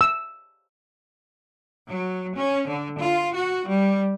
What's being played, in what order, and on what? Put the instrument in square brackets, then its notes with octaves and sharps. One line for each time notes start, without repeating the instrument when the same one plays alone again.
[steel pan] E6
[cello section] F#3
C#4
D3
F4
F#4
G3